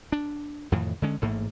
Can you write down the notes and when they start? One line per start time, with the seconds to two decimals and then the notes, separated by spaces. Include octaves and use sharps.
0.12 D4
0.72 F2 A2 D#3 E3
1.02 D3 G#3 C#4
1.22 A1 G#2 A3 A#3